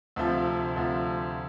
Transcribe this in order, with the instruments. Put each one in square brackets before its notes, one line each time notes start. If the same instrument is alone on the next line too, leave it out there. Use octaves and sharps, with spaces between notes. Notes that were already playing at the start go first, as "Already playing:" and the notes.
[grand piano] D2 C3 F3
D2 C3 F3